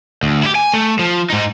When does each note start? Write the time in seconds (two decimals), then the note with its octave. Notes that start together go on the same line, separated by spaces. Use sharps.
0.23 D2
0.43 E4 G4
0.55 G#5
0.74 A3
0.99 F3
1.30 G#2 D#4